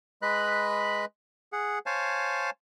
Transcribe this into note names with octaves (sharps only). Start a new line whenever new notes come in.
G#3 B4 D#5 B5 F#6
G#4 F#5
C5 C#5 F5 G#5 A5